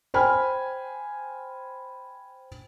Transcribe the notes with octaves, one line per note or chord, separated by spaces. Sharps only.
C5 G5 G#5 B5 F6